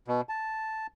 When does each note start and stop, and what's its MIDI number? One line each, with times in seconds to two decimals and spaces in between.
0.08 0.21 47
0.29 0.87 81